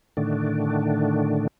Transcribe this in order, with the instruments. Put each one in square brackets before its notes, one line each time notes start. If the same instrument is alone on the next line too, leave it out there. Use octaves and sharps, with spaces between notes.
[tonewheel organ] A2 D3 D#3 A3 D4